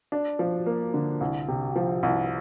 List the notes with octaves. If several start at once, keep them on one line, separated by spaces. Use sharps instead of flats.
D4
F3
A#3
D3
C2
C3
F3
C2